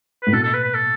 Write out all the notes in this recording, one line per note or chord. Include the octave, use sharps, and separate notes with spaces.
A2 B4
B2 A4
A4
B4
B4
A4